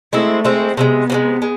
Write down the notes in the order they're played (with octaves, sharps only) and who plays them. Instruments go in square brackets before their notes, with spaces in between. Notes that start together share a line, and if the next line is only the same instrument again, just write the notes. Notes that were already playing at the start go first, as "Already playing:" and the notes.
[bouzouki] G#3 C4 E4 [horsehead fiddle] A3
[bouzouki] G#3 C4 E4
[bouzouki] C3 F3 G#3 [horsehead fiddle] B3
[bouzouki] C3 F3 G#3
G#3